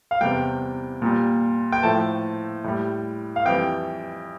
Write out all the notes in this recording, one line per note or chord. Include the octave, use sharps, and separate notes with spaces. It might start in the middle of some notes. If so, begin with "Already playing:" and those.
F5
E2 C3 G3 G5
A#2 G3
G5
A2 F3 A3 A5
A2 G3
F5
F2 E3 G3 G5